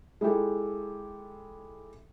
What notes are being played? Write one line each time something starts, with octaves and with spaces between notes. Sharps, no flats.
G#3 E4 F4 G4 A4